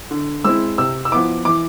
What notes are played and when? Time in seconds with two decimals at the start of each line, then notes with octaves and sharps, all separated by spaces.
0.11 D3
0.44 G#3 C4 E4 E6
0.78 C3 E6
1.05 E6
1.12 F3 B3 E4 D6
1.45 E3 D6